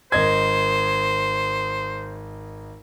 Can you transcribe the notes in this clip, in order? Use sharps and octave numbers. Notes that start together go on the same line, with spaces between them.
G#1 C5 D#5 G#6